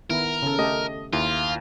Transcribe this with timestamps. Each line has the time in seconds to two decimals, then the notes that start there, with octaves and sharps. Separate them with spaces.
0.10 D#3 B3 E4 A#4
0.42 C#3 A4
0.59 A3 G4 A4 D#5
1.13 D#2 E4 F4